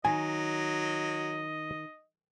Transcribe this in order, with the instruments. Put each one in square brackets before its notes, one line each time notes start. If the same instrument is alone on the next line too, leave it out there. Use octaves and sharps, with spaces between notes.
[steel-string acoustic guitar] D#3 [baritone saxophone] F#3 [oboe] D#5 [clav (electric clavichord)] G#5